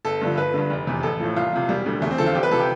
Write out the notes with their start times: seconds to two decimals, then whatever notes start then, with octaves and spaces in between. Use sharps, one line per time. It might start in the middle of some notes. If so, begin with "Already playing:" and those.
0.05 G1 A4
0.21 G2 D3 F3
0.37 G1 B4
0.54 G2 D3
0.70 F1
0.87 E2 C3
1.03 A1 A4
1.20 A2 F3
1.36 C2 F4
1.53 C3 F3
1.69 E1 G3
1.86 D2 D3
2.02 E2 A3
2.11 C4
2.18 D3 F3 A4
2.26 F4
2.35 C2 G4
2.43 B4
2.51 C3 F3 A4
2.60 G4